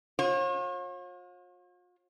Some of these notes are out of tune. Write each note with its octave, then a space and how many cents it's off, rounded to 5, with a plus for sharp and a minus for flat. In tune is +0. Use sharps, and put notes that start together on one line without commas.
F4 +40 C#5 -45